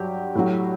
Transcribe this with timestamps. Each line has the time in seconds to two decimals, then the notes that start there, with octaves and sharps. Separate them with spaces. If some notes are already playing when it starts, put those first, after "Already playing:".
Already playing: G2 F#3 G4
0.35 A2 F#3